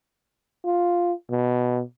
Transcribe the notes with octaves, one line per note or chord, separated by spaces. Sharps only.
F4
B2